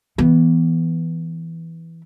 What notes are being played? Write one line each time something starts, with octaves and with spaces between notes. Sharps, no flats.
E3 B3